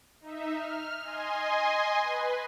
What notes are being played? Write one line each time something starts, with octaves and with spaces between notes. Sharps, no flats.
D#4 E5
F6
D#5 G#5 C6
B4